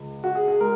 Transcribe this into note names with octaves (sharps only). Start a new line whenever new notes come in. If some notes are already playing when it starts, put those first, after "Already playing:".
Already playing: C#2 G#3
F#4
G#4
G#4
G#3 A#4